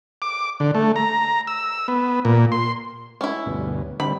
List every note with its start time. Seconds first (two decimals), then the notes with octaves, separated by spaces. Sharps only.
0.22 D6
0.60 D3
0.75 A3
0.96 A#5
1.47 E6
1.88 B3
2.25 A#2
2.52 C6
3.21 C#4 E4
3.46 D2 G2 B2
4.00 D3 G3 C4 B5